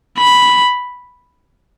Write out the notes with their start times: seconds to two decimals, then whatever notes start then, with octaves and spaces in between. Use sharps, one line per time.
0.18 B5